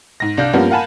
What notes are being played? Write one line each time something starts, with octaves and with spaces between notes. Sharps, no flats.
G#2 A#6
C2 D4 F5 G6
G2 F3 G3 A#3 B3 C#4
A#4 F5 F#5 G#5 A5 B5